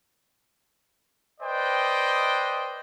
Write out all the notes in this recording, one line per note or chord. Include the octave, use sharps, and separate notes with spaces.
B4 C5 D5 D#5 G5